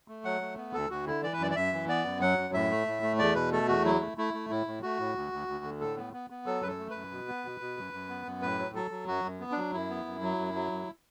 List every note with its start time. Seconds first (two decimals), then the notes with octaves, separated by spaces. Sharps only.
0.08 A3
0.25 F#3 F#5
0.41 A3
0.57 B3
0.74 D2 A4
0.90 D2 F#4
1.07 D3 E4
1.23 E3 D5
1.33 B4
1.39 F#2 D5
1.51 D5
1.56 F#2 E5
1.73 E3
1.88 B3 D5
2.05 F#2
2.21 F#3 F#5
2.38 F#2
2.54 A2 E5
2.70 A3
2.87 A2
3.03 A3
3.19 E2 D5
3.35 B2 B4
3.52 A3 A4
3.68 E2 F#4
3.84 F#3 E4
4.01 A3
4.18 A3 E4
4.34 A3
4.50 A2 E4
4.67 A2
4.82 A3 F#4
4.99 A2
5.15 D2
5.32 D2
5.48 D2
5.64 D3
5.81 A2 A4
5.97 B3
6.13 B3
6.30 B3
6.46 F#3 A4
6.62 F#2 B4
6.68 A4
6.79 A3
6.90 F#2 B4
7.11 B2
7.28 B3
7.45 B2
7.61 B2
7.77 F#2
7.93 F#2
8.09 B3
8.26 F#2
8.42 A2 B4
8.59 F#3
8.75 F#3 A4
8.91 F#3
9.08 F#2 F#4
9.24 F#2
9.40 B3
9.52 D4
9.57 F#3
9.73 F#2 E4
9.89 B3
10.05 F#2
10.22 F#3
10.39 F#2
10.55 F#3
10.71 F#2